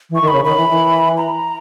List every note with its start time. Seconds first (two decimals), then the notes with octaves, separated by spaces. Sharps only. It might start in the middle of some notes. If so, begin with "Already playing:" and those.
0.10 E3
0.15 C#6
0.22 D#3
0.27 B5
0.34 C#3
0.45 D#3 B5
0.57 E3
0.69 E3
1.17 A#5